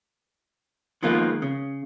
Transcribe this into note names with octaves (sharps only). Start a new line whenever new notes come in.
D#3 F3 G#3 A#3 B3 F4
C#3